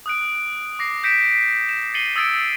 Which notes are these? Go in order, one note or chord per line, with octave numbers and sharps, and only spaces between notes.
D#6 F#6 D7
D6 A#6 C7
G6 A#6 B6 C#7 D7 E7
E7
A6 C7 C#7 D#7 F#7 G7
D#6 E6 G#6 A6 C#7 D7